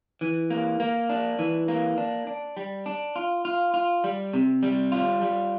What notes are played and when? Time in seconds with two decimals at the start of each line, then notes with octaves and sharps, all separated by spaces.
0.21 E3
0.50 A#3
0.80 A#3
1.09 D4
1.39 E3
1.68 A#3
1.98 D4
2.27 D4
2.57 G3
2.86 D4
3.16 F4
3.45 F4
3.74 F4
4.04 G3
4.33 C3
4.63 G3
4.92 F4
5.22 G3